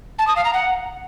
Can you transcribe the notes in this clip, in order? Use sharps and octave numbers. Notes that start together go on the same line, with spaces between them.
A5
D#6
F5
A#5
F#5